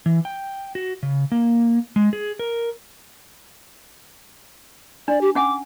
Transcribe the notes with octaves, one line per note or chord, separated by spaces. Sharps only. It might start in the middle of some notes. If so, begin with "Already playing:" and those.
E3
G5
F#4
C#3
A#3
G#3
G#4
A#4
D4 D5
G4
C#4 F#5 G#5 D6